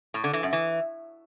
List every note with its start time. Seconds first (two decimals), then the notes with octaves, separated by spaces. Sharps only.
0.14 A2
0.24 D3
0.33 E3
0.43 F#2
0.53 E3